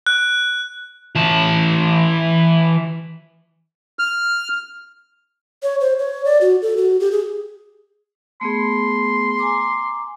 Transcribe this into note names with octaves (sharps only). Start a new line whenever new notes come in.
F#6
E3 A5
F6
C#5
C5
C#5
D5
F#4
A4
F#4
G4
G#4
A3 B3 G#4 C6
G#5 A#5 D6